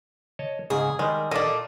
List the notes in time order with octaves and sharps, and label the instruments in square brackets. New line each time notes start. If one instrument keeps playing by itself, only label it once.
[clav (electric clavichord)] C#5 D#5 A5
[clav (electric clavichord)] G#2 C#3 [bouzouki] G#4
[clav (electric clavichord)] D#3 G3 [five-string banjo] G#3 [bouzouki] A#4
[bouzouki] A#2 A3 A#3 [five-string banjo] D5 D#5